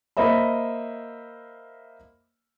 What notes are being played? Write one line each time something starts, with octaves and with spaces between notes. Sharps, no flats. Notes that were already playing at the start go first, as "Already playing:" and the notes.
A#3 C5 D#5 E5 B5